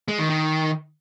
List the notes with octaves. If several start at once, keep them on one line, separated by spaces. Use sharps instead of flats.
G#3
D#3
D#3